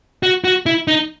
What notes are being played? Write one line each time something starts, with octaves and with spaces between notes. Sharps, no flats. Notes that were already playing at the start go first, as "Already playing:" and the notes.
F#4
F#4
E4
D#4